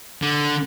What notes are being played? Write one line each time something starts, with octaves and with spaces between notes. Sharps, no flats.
D3